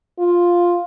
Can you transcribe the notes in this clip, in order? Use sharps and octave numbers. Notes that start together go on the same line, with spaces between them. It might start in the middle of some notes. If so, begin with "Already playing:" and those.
F4